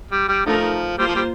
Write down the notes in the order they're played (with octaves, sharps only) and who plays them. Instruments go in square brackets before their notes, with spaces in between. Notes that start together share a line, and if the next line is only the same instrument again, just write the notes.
[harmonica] G3
G3
[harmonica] D3 F3 [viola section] A3 D#4 A#4
[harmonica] G3 [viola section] A#3 F4 C5
[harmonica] F3
G3